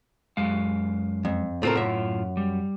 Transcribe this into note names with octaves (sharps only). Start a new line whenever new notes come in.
F#2 G#3 F5
F2
A2 A3 C4 F4 A#4
F#2 E5
G3